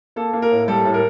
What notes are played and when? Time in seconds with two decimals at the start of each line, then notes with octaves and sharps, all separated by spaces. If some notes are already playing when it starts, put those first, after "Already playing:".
0.16 A#3 A4
0.33 A#3
0.42 A#4
0.51 A2
0.68 G3 A4
0.85 A2
0.94 A#4